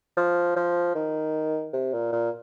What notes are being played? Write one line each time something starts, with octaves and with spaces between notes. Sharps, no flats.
F3
F3
D#3
C3
A#2
A#2